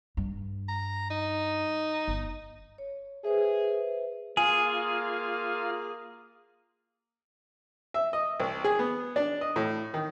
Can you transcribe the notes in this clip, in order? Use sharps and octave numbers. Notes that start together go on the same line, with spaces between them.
G2
A#5
D#4
G1
C#5
G#4 B4 C5 E5
A#3 F4 G#4 G#5
E5
D#5
C2
G#4
B3
D4
D#5
A2
D#3